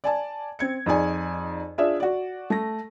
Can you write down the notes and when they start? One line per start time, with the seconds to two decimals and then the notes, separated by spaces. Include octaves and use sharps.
0.04 D5 G#5 A5
0.59 C4 G#6 C#7
0.86 F2 D#4 G#4 D5 G#5
1.78 D4 F4 G#4 D5 E5
2.00 F#4 D5
2.50 A3 A#6